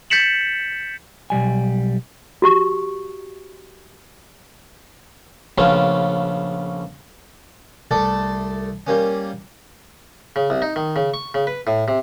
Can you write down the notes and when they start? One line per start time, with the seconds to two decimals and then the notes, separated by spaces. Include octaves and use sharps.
0.10 G6 A6 B6 C#7 E7 F#7
1.30 B1 C3 G3 G#5
2.42 F#4 G4 C#6
5.58 A#1 C#3 A3 B3 C#4 F4
7.91 C2 A3 A4 D5 A5
8.87 G3 A#3 C#4
10.36 C#3
10.50 C2
10.62 D#4
10.76 D#3
10.96 C#3
11.14 C#6
11.34 C#3
11.47 B4
11.67 A2
11.88 C3